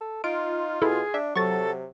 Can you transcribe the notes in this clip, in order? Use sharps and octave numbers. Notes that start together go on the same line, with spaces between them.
A4
D#4 F4 D7
B2 E4 G#4 A4
D4 E5
C3 F#3 A4 C#6 A6